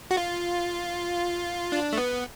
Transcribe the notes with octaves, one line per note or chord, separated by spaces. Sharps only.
F#4
F4
D4
A3
B3